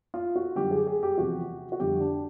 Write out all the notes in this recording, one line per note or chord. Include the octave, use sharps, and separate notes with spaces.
F4
F#4
F#2 D3 G3 G4
G#4
G#4
G4
E2 C3 F3 F#4
F#4
F2 D3 G3 G4
D4